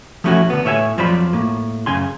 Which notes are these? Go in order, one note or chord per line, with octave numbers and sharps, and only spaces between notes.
F3 G3 A3 C#4 E4 F#4
D3 B3
A2 C#5 E5 G5 G#5
F2 F3 F#3 C5 D5 B5
A2 A#3
F#2 C#3 G#5 C6